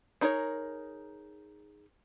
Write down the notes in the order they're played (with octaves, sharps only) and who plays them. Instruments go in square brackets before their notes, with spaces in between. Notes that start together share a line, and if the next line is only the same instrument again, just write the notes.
[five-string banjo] D4 D#4 G#4 A#4 C#5